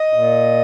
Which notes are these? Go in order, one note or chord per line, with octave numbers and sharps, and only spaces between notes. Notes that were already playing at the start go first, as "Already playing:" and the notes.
Already playing: D#5
A#2